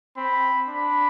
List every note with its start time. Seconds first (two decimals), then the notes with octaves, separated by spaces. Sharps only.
0.16 C4 B5
0.67 D4 B5